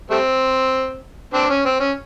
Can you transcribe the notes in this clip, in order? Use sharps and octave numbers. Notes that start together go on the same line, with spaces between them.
G3 A3 C4
C4 D4
C#4
C4
C#4